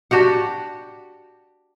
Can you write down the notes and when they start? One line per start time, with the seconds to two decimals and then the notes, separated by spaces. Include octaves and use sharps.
0.11 D4 F#4 G4 F#5